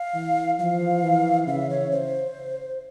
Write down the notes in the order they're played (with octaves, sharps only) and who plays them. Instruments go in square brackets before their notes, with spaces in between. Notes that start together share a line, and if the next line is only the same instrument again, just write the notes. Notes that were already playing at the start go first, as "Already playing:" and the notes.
Already playing: [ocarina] F5
[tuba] E3
[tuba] F3 [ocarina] F5
[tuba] E3
[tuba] C#3 [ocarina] E5
[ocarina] C#5
C5